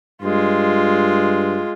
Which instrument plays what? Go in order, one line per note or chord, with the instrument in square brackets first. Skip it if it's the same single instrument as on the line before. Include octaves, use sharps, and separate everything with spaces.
[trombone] G2 [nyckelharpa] G#3 F4